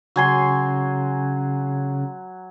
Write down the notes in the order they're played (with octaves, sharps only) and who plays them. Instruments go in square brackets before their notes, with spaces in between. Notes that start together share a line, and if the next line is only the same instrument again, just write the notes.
[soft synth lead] C#3 [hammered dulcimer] F#3 G#5 C6